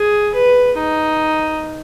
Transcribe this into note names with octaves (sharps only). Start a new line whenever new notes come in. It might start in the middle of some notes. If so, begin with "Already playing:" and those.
Already playing: G#4
B4
D#4